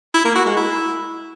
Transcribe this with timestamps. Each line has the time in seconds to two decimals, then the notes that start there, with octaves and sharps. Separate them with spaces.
0.14 E4
0.25 A#3
0.35 F#4
0.46 G#3
0.57 E4